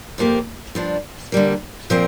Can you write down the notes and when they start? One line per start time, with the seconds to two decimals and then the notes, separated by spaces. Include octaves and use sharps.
0.18 F2 F3 A#3 G4
0.75 G2 F3 D4
1.32 D3 G3 A#3
1.90 A#2 F3 C4 A#4